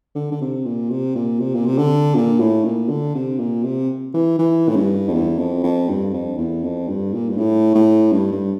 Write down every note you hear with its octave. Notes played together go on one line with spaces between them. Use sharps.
D3
D3
C3
A#2
C3
A#2
C3
A#2
C3
D3
A#2
A2
A#2
D3
C3
A#2
C3
E3
E3
A2
G2
F2
E2
F2
F2
G2
F2
E2
F2
G2
A#2
G2
A2
A2
G2
G2